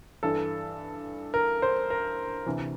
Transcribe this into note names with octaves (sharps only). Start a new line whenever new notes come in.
G2 E3 A4
A#4
C5
A#4
D2 C3 E3